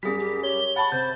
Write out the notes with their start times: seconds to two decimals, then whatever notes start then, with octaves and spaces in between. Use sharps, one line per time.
0.03 F#2 G3 G4 G#4 B6
0.18 G4
0.43 G4 C#5 G7
0.76 F#5 A5 B5 C#6 A6
0.92 C3 C5 G6